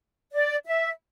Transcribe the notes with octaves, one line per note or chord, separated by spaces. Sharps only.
D5
E5